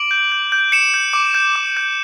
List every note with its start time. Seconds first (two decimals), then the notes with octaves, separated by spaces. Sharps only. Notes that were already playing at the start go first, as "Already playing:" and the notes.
Already playing: D6 D7 F#7
0.11 G6
0.32 G6
0.52 G6
0.72 G6 C#7 E7
0.94 G6
1.13 D6
1.34 G6
1.56 D6
1.77 G6